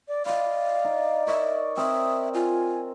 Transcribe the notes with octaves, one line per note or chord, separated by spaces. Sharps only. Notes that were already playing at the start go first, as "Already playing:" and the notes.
D5
D5 D#5 F5 B5
D#4
A#4 C#5 D#5 E5
C4 A#4 D5 E5 D#6
F4 G#5